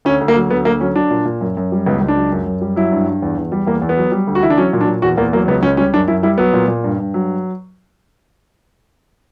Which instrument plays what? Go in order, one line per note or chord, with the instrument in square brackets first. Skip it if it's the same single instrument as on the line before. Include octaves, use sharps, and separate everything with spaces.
[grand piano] D2 C#4
D2
A#3
F#3
D2 B3
D2 A#3
F#3 C#4
F#3 D4
A#2
A#2
F#2
F#2
G3
C#2 B3
C#2
D4
F#3
F#2
F#2
G3
F#3 E4
G2
G2
E2
E2
G3
E2 A#3
E2
B3
F#3
G3
D2
F#4
E3 E4
D4
F#3 C#4
A#2
D4
A#2
E2 F#4
E2 A#3
F#3 A#3
C#2 B3
C#2 C#4
G3 C#4
F#2 D4
F#2 E4
G3 E4
F#3 B3
A#2
A#2
G2
G2
F#3